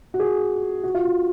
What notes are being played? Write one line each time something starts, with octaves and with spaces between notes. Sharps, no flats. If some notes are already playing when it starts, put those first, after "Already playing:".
F#4
G#4
F#4
F4
F#4